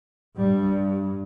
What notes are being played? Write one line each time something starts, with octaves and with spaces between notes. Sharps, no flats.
G2 G3